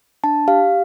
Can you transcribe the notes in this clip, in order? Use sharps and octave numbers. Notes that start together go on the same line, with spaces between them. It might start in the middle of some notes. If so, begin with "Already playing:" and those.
D4 A5
G4 F5